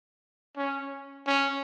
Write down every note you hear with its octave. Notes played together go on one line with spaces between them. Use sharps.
C#4
C#4